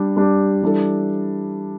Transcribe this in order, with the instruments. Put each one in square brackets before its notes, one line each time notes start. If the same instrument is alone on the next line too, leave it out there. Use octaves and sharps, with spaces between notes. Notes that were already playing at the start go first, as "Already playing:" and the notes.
Already playing: [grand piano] G3 D4 G4
G3 D4 G4
E3 G3 D4 A4